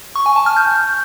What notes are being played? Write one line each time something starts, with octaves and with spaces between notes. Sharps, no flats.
C#6
G#5
A5
F6
G6